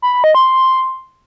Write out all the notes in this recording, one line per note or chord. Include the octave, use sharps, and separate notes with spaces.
B5
B5
D#5
C6